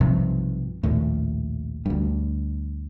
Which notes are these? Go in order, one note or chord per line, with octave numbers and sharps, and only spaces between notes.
B1 G2 C3 F3
A#1 D#2 A2
D2 G2